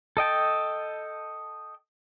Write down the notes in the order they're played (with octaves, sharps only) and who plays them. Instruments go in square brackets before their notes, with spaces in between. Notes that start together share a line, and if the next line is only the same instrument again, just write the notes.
[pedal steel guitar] A4 D#5 G5 A5